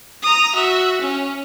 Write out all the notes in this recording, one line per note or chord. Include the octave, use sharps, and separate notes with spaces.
A#5 D#6
F#4 E5
C#4